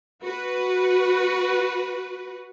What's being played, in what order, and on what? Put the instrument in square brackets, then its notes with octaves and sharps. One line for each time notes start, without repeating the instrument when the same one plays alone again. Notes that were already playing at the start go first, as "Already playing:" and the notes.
[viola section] F#4 B4